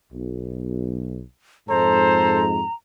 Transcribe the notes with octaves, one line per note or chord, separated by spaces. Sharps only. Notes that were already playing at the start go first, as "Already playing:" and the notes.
B1
F2 G#2 A4 C5 A#5